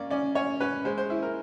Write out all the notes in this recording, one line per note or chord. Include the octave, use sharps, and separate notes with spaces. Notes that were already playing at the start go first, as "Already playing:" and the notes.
Already playing: A#3 C#4 D5
C#4 D5
C#4 C#5
C#4 B4
G#3 C5
C5
E4
A#4